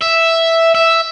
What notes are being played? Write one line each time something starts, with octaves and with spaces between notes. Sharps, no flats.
E5
E5